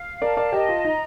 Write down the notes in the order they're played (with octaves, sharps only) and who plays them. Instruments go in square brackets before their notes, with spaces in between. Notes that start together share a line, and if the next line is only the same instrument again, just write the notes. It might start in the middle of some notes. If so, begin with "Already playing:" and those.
Already playing: [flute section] F5
[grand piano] A#4 D5 [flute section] A5
[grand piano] A#4 D5
[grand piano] G4 A#4 [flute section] D#5
[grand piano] F4
[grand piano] D#4 [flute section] A#5